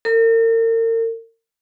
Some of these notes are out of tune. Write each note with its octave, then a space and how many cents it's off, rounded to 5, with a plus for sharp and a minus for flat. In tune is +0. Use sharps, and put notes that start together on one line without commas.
A#4 -40